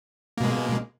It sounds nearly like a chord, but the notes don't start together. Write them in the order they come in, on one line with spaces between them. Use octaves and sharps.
A#3 B2 G#3